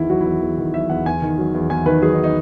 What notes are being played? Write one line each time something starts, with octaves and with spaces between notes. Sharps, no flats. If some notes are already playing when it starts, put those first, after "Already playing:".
Already playing: E2 D#3 E4
F#3 F#4
E4
E2
E2
D#3
F#3 E5
E2 F#5
E2 G#5
D#3
F#3
E2
E2 G#5
D#3 B4
F#3 G#4
D#4
D#4